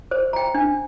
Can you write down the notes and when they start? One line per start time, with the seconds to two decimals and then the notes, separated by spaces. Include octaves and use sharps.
0.11 C5
0.33 G5 A#5
0.54 D4